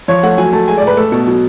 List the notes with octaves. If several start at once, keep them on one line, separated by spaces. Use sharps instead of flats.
F3 C#5
A3 F#5
F#3 G#5
A3 A5
G#3 G#5
D5
A2 B4
A3 A4
B2 A4
F#3